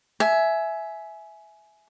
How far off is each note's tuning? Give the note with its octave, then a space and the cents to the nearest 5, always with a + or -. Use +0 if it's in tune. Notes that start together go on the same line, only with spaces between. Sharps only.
E5 +0 G#5 +20